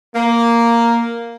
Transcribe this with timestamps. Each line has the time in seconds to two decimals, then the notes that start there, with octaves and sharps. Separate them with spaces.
0.16 A#3